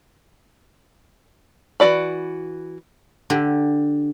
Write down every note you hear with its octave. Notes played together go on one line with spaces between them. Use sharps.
E3 A3 F#4 D5 B5
D3 G4